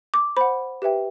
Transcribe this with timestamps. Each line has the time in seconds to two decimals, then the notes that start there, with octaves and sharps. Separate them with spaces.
0.14 D6
0.37 C5 F#5 B5
0.82 G4 B4 E5 G5